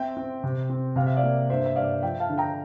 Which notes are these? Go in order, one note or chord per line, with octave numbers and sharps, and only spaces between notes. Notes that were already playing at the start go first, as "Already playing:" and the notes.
Already playing: C4 E5 G5
C4
C3
C4
C3 F5
E5
D5 F5
A#3
G2 C5 E5
E5
G2 D5 F5
F3 E5 G5
F5 A5
D3
G5 A#5